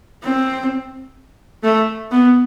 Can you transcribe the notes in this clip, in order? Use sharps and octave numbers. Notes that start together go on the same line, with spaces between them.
C4
A3
B3